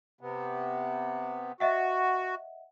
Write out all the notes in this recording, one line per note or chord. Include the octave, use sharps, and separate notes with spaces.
C3 B3
F#4 D#5 E5 F#5